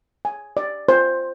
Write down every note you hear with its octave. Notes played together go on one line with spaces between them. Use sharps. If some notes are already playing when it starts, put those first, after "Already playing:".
G#5
D5
C5